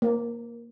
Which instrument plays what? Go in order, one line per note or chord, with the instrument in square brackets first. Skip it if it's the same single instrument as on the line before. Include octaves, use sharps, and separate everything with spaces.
[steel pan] A#3